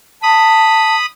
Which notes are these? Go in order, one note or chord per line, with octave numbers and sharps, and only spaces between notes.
A5 B5 D#6